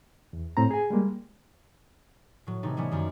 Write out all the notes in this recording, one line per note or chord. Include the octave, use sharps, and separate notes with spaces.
E2
A2 C4 A#5
G#4 G#5
G3 G#3 A#3
A2 F#3
C3 E3 A3 D#4
E3 G3 B3 C#4
F#2 D#3